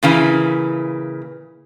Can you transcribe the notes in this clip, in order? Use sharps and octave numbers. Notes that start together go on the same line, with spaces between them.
A#2 C#3 E3